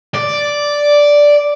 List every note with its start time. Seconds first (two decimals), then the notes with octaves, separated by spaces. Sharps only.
0.14 D5